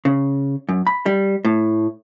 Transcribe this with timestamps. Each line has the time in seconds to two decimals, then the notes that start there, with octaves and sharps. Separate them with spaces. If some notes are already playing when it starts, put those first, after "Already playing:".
0.05 C#3
0.69 F#2
0.87 B5
1.06 G3
1.45 A2